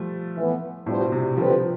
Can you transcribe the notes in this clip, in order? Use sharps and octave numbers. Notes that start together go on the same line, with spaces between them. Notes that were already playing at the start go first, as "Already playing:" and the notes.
Already playing: F3 G3 A3
A2 E3 B3
A2 G3 B3 D4 F4 C5
B2
C3
D3 F3 G3 C4 G4 B4
F3